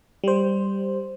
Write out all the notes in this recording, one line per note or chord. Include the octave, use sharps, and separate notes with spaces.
G3 C5